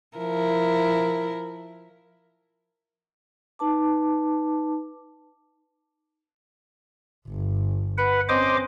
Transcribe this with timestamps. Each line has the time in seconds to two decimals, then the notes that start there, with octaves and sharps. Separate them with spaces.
0.17 F3 E4 A#4
3.59 D#4 B4 A5 D6
7.29 G1
7.98 B4 F#5
8.29 C4 C#4 C5 D#5 D6